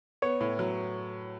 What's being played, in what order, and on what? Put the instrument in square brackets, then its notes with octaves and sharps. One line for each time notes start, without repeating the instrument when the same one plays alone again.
[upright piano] B3 [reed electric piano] C#5
[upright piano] A2
F#3